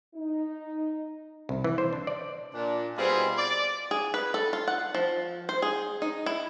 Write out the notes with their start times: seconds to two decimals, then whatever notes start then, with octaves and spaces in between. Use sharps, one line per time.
0.15 D#4
1.49 C2
1.64 E3
1.78 C5
1.93 D4
2.07 D5
2.54 A#2 D4
2.97 B2 G3 C4 D#4 F4 G#4
3.37 D5
3.91 G#4
4.14 B4
4.34 A4
4.53 F4
4.68 F#5
4.94 F3
5.49 C5
5.62 G#4
6.02 D#4
6.26 E4